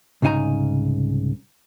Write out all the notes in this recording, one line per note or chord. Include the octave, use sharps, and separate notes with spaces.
C2 G#2 C#3 D#4 G#5 A#5